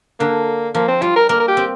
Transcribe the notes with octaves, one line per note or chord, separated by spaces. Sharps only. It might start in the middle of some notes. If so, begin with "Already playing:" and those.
D3 A#3
F3 A#3
C4
G3 F4
A#4
A#3 A#4
A#4
G4
C4